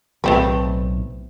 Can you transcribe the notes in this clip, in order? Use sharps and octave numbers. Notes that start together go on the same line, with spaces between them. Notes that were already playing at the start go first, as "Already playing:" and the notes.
B1 A2 A3 C4 B4